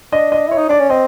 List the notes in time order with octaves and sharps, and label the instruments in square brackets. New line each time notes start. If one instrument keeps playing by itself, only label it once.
[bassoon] D4 [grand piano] D#5
[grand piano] D#5
[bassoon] E4 [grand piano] C#5
[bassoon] D#4
[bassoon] D4 [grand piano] D5
[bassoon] C#4
[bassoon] C4 [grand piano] D#5